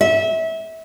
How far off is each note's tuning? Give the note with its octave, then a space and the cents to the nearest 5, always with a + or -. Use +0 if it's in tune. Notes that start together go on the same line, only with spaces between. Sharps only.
E5 -25